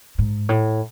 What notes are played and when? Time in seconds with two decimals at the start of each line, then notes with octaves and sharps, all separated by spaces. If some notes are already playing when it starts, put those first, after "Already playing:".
0.18 G#2
0.49 A2